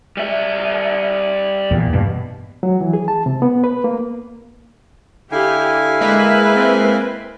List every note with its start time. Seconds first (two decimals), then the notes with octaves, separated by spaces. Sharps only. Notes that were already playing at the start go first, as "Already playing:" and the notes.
0.17 G3 E5
1.71 E2 A#2
1.93 G2 B2
2.63 F#3
2.81 E3
2.93 G#4
3.08 A5
3.26 C3
3.42 B3
3.64 B4
3.84 A#3
5.32 D3 E4 G4 F5 G#5
6.01 G#3 A#3 B4 E5
6.55 C4